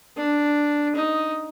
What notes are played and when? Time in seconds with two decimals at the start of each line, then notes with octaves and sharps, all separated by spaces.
0.17 D4
0.95 D#4